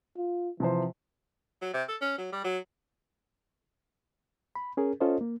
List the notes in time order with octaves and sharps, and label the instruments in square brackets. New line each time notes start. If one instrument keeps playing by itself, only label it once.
[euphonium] F4
[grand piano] C3 F3 C5 [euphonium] E3
[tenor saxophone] F#3
C3
A4
C#4
F#3
G3
F#3
[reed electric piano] B5
C#4 G#4 A#4
C#4 F4 A4 C5 D#5
A#3